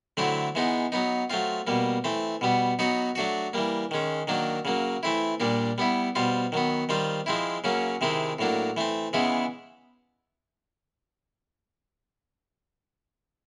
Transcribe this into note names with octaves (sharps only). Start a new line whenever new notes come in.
D3 F#3 A3 C4 E4
E3 G#3 B3 D#4
F#3 B3 D#4
F#3 A3 C4 F4
B2 G3 A#3
E3 A3 C4
B2 G3 B3
F#3 B3 D#4 F#4
F#3 A3 D4 F#4
E3 G3 A#3
D#3 G#3 C#4
D#3 F#3 A#3 D4
C#3 F#3 A#3
E3 A3 C4 E4
A#2 G3 A#3 D4
G3 B3 E4
B2 G3 C4 F4
D#3 F#3 B3
D#3 G3 C4 F4
F3 G#3 C4 E4
C#3 F#3 A#3 C#4
C3 D#3 G#3 C4 E4
A2 F#3 A#3 D4
E3 A3 C4
C#3 E3 G#3 B3 E4